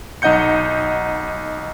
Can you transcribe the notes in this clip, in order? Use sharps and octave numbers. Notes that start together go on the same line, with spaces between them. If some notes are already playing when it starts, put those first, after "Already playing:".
B1 D#4 D#5 F#5 G6 C#7